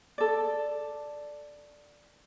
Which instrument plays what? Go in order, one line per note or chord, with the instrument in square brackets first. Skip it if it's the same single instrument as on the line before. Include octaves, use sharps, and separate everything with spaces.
[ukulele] A4 D5